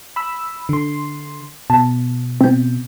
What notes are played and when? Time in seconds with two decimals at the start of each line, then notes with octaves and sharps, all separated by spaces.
0.16 B5 E6
0.69 D3 C6
1.70 B2 A5
2.41 B2 C4 G6